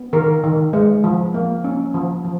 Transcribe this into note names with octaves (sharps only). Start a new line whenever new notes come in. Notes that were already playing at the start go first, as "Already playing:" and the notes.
Already playing: B3
D#3 A#4
D#3
G#3
F3
A#3
C#4
F3
F3